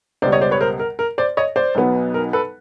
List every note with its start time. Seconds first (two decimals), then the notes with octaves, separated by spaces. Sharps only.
0.22 C#2 B2 G3 C5 D5
0.32 C#5 D#5
0.41 C5 D5
0.51 B4 C#5
0.61 A#4 C5
0.79 A#4
0.99 A#4
1.18 C5 D5
1.37 C#5 D#5
1.56 C5 D5
1.75 B1 B2 F#3 B3
2.14 A#4
2.33 A4 B4